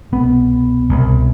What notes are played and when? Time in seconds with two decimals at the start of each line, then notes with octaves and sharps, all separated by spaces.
0.12 C2 B2 B3
0.89 C2 B2